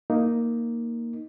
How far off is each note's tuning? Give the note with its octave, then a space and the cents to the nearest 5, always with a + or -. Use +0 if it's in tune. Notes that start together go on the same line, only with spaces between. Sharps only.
A#3 +0 D#4 +0